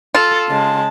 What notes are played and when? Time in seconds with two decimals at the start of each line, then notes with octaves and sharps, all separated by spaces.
0.15 F4 A4
0.49 C#3 G#3 A5